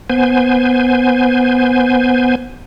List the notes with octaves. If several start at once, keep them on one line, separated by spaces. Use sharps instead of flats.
B3 C5 G#5